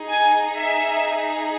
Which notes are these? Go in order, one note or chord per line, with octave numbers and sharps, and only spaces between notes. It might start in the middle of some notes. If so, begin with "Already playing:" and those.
Already playing: D#4 G#4
G#5
E5